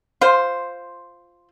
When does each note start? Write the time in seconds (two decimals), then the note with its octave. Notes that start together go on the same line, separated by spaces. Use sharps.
0.21 F4 C5